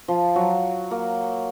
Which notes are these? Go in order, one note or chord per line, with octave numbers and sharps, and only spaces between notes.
F3
F#3
A#3